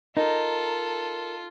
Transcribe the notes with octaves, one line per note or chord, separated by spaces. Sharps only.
D#4 F4 A4 A#4